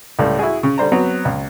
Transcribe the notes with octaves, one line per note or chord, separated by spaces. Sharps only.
C#2 A2 G3
E4 F#4 G#4
C#3
D3 G3 C5 A#5
F#3 B3 C4
C#2